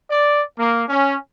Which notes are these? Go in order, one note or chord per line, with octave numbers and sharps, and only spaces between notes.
D5
A#3
C#4